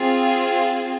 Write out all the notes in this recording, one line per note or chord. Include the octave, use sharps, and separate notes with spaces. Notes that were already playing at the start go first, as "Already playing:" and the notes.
Already playing: C4 F4 G#4